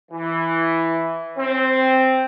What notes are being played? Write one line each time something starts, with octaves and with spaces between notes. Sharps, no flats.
E3
C4